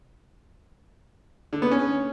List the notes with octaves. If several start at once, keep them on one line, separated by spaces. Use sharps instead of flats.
D3
B3
C#4